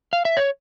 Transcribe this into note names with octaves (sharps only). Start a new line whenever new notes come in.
F5
E5
C#5